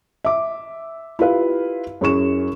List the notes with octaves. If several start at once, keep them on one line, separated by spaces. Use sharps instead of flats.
E5 D6
E4 F4 G4 B4 F5
F#2 E4 G#4 C#6 E7